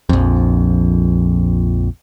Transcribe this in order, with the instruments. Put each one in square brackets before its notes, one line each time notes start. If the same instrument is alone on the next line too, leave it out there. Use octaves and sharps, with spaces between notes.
[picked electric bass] A#1 F2